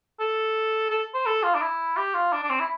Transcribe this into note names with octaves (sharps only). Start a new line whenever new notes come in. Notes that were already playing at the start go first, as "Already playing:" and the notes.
A4
A4
C5
A4
F4
D4
E4
G4
F4
D4
D4
C4
E4